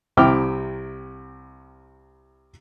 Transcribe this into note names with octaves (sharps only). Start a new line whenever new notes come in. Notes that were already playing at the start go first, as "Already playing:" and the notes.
C2 C3 E4 G5 D6 F6